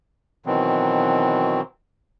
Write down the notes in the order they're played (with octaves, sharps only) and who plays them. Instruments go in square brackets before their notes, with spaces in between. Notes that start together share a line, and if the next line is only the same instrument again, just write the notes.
[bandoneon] B2 D#3 E3 F#3 C4